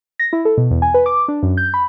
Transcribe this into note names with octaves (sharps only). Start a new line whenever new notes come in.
A#6
E4
A4
B2
E2
G#5
B4
D6
D4
F#2
G6
B5